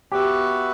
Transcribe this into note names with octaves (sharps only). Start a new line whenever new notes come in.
B3 F#4 G4 B4 E5